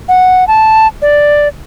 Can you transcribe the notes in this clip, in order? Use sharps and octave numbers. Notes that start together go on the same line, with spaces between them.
F#5
A5
D5